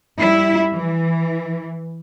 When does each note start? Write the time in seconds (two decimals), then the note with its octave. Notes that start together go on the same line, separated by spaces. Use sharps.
0.18 G3 E4
0.73 E3